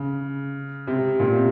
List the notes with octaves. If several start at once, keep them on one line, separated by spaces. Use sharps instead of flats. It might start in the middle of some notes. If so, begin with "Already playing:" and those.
Already playing: C#3
C3
A#2
C3